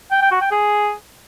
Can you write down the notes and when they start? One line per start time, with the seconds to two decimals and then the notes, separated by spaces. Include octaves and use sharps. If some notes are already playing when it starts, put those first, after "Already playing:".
0.11 G5
0.21 G5
0.31 F#4
0.41 G5
0.51 G#4